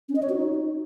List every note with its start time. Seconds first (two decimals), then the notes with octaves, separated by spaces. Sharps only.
0.09 C#4
0.16 D#5
0.22 C#5
0.29 F#4
0.36 D#4